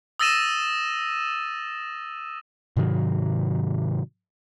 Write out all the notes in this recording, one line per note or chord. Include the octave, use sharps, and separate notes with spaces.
D#6 E6 A6 A#6 D#7 E7
G#2 C3 D#3 F#3